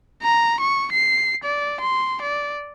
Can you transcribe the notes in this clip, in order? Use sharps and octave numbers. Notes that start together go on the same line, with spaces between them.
A#5
C#6
C7
D5
C6
D5